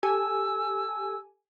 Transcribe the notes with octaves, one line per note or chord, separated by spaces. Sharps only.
G4 A4 G#5 E6